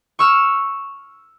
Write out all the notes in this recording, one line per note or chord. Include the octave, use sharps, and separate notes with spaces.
C#6 E6 F6